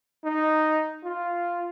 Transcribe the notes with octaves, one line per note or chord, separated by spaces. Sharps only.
D#4
F4